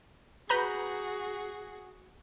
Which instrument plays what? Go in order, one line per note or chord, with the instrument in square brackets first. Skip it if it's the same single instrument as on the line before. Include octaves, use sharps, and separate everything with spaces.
[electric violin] F#4 G#4 [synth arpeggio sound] B4 A#5 G6